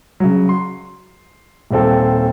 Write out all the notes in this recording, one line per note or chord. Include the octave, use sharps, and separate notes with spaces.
C#3 F#3
C6
D#1 D#2 C4 A4